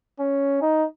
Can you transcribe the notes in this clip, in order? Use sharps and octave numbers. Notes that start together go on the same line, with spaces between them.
C#4
D#4